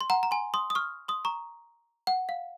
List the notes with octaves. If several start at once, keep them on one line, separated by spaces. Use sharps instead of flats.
C6
F#5 A#5
A#5
G#5 C6
C6 D#6
D#6
C#6 F6
C6 D#6
A#5 C#6
F#5
F5